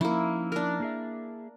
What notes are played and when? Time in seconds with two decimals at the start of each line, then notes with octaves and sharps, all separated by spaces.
0.01 F3 A#3 C#4 D#4 E4
0.52 D4 A#4
0.80 A#3 G#4 E5